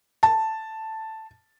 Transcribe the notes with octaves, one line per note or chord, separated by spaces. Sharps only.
A5